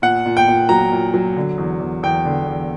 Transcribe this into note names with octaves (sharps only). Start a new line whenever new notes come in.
A#2 F#5
A#2
G5
A#2
F#3 A#5
A#2
F#3
D3
E2
E2
E2 G5
D3
E2